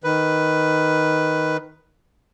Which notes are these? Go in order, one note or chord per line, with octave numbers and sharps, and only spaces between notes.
D#3 B4